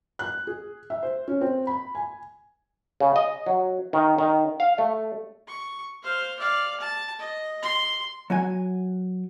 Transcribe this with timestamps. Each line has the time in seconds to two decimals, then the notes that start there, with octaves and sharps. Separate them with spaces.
0.19 F#6
0.47 G#4
0.90 E5
1.03 C5
1.28 C#4
1.41 C4
1.67 B5
1.95 G#5
3.00 C#3
3.16 D#5
3.46 F#3
3.93 D#3
4.18 D#3
4.60 F5
4.78 A3
5.48 C#6
6.03 C5 F5
6.39 D5 F5
6.80 A5
7.18 D#5
7.63 C6
8.30 F#3 F#4 G#5